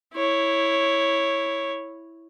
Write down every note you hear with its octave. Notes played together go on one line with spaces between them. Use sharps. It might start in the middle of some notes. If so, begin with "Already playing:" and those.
E4 C#5